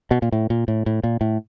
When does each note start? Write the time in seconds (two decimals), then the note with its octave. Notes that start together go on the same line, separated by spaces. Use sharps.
0.11 B2
0.22 A#2
0.32 A2
0.50 A#2
0.68 A2
0.86 A2
1.04 A#2
1.21 A2